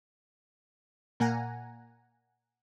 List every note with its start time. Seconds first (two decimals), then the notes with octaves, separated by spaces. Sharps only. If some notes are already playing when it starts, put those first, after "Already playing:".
1.20 A#2 A#3 F#5 G#5 A#5